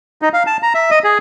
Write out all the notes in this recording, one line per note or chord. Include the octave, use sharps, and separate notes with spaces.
D#4
F5
A5
A#5
E5
D#5
G#4